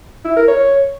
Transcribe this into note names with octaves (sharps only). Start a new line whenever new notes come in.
E4
A#4
C#5